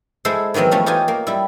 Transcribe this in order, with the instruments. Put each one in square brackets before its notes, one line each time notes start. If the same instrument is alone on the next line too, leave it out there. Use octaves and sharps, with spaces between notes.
[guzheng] G#3 E4 A4 C5 F#5
D#3 E3 F#3 B3 C4
E3 F3 A3 C#4
D#4 F4 G4 G#5
A#3
G3 E4